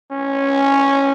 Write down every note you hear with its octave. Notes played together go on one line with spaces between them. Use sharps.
C#4